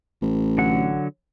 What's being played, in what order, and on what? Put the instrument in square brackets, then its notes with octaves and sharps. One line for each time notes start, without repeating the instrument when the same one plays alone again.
[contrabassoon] A1
[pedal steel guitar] D3 F#3 F#5